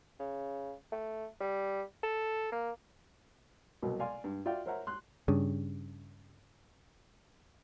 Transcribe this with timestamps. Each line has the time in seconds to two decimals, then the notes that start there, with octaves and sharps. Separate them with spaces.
0.20 C#3
0.92 A3
1.41 G3
2.03 A4
2.52 A#3
3.82 C2 B2 F#3
4.00 D5 F5 G#5 C6
4.24 G2
4.46 F4 F#4 D5 E5 F5 G5
4.66 A#4 C5 C#5 E5 F#5 A#5
4.87 C6 F#6
5.28 G2 C#3